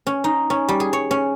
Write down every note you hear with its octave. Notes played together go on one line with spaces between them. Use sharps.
C#4
D#4
C#4
G3
G#4
C#5
C#4